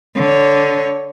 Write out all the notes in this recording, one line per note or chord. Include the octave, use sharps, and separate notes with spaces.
D3 C#5